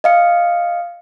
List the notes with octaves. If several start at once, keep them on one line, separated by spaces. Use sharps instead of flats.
D#5 F5 C#7